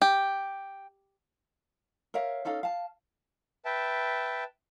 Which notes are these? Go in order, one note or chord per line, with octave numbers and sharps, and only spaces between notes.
G4
A#4 C#5 E5 F5
C#4 D#4 A4 F5
F5 A5
B4 E5 G5 A5